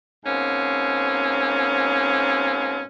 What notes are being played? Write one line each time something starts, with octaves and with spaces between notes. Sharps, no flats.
G#2 B2 A#3 C4 C#4